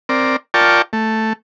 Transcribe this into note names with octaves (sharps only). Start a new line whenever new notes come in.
C4 A#4 D5
F4 A#4 D5 G5 A5 C#6
A3